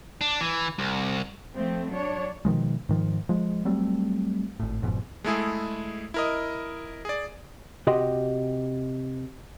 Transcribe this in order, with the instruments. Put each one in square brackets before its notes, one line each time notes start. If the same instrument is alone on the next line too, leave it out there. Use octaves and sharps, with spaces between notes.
[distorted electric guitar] D4
E3
C2
[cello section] F3 A3 C4
F#3 D4 C#5
[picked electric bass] B2 D#3 F3 G#3
G#2 D#3 F3
F3 G#3
F#3 G3 A3 C4
G#1 A2
F#1 F2 G#2 B2
[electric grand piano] G#3 A3 E4 G#4
E4 A#4 D#5
G#4 D5
[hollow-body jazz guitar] C3 F#4 G4 D#5 G5 C6